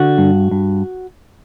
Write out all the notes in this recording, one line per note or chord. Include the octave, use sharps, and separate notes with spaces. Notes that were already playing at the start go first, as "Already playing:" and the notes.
Already playing: D3 F#4
G2
G2